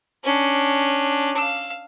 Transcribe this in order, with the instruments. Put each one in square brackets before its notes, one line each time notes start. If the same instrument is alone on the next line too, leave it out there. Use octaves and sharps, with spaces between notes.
[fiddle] C#4 D4
F5 E6